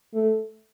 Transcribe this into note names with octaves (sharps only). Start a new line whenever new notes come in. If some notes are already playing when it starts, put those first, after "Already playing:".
A3